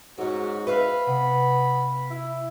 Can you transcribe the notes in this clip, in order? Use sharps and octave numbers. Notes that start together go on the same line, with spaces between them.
G#2 F#3 C#4 F#4
B4 E5 F5 B5
C3 B3
E4